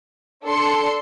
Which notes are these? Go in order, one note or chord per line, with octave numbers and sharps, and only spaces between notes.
D4 A4 C6 C#7